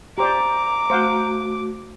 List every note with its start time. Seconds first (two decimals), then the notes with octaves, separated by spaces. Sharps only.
0.18 G4 C5 D5 A#5 D6
0.90 A3 F#4 C5 F5 F#5